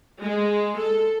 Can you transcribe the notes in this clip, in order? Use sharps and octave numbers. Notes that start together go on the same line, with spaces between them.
G#3
A4